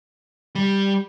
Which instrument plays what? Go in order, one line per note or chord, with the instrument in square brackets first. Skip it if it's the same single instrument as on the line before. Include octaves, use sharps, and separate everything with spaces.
[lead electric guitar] G3